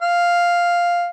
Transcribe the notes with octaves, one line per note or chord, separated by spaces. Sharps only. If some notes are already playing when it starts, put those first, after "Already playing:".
F5